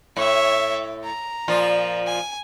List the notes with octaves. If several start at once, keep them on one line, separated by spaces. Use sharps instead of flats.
A2 C#5 E5
A#5
A#2 F3 F4
G#5